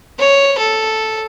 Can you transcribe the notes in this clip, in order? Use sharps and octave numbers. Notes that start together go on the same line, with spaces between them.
C#5
A4